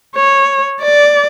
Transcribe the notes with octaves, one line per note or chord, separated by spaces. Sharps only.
C#5
D5